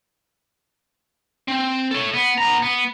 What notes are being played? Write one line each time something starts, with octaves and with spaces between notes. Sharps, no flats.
C4
A4 C#5
B3
B3 A#5
B3